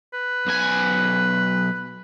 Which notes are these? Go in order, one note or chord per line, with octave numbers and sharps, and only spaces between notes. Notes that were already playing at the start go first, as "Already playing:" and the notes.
B4
B1 G#5